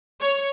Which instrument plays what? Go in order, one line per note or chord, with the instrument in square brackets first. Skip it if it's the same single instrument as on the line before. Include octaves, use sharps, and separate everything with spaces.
[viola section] C#5